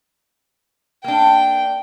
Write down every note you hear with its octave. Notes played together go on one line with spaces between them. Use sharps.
A#3 D4 G5